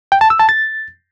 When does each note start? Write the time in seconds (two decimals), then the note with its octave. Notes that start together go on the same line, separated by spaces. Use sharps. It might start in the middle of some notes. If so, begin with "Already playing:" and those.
0.12 G5
0.21 A5
0.30 E6
0.40 A5
0.49 A6